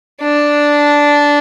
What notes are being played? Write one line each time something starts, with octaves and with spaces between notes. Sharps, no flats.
D4